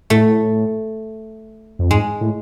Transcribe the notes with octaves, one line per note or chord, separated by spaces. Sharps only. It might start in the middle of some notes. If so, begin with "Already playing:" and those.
A2 A3
F2
G#2 G#3
A2